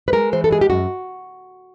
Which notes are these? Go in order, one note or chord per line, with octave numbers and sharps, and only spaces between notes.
B4
G#3 A#4
E3 C5
A4
G#3 G#4
G4
F#2 F#4